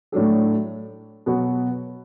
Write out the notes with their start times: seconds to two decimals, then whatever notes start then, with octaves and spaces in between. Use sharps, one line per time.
0.12 A2 F#3 D4 A4
1.26 B2 F#3 B3 F#4